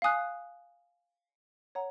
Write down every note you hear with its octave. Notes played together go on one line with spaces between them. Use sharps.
F5 G#5 D#6 F#6
C#5 F#5 A#5